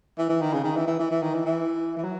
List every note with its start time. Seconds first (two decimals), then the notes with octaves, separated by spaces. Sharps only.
0.18 E3
0.29 E3
0.41 D#3
0.53 C#3
0.64 D#3
0.76 E3
0.87 E3
0.99 E3
1.11 E3
1.22 D#3
1.34 E3
1.45 E3
1.97 E3
2.04 F#3